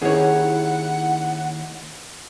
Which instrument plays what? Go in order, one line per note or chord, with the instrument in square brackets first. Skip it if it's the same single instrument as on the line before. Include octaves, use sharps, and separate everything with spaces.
[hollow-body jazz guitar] D#2 [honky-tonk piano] C#4 E4 [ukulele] G#4 C#5 [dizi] F#5